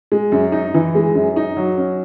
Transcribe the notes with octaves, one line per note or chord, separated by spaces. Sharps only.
G#3
F#2
D#4
E3
G#3
F#2
D#4
F#3
C#4